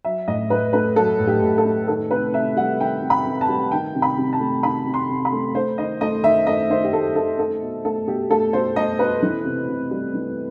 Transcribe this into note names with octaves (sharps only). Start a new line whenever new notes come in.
F#3 E5
A2 D#5
A2 B4
A3 B4
F#3 A4
A2
G4
A2
A4
A3
D#3 A4
C3 B4
C3 E5
G3 F#5
D#3 G5
C3
B5
C3
A5
G3
D#3 G5
C3
B5
C3
A5
A3
D#3 B5
C3
C6
C3
B5
A3
A3 C5
D#3 D#5
A3 D#5
D#3 E5
A3 D#5
D#3 C5
G4
A3 A4
D#3 A4
A3 A4
B2
A3 A4
B2 G4
A3 A4
B2 C5
A3 D#5
B2 B4
E3
C3
C3
G3
E3